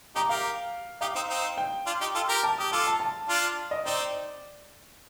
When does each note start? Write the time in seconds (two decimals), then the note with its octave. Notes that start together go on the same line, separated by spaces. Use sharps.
0.16 D#4 G4 A#5
0.29 G4 A#4 F5
1.01 D#4 G4 F5
1.15 C4 D#4
1.30 C4 D#4
1.58 G5
1.86 D4 F4
2.01 D#4 G4
2.15 F4 A4
2.29 G4 A#4
2.43 A5
2.58 G4 D#6
2.71 F4 A4 D6
2.87 A5
3.00 A5
3.29 D4 F4
3.71 D#5
3.86 C4 D#4 D5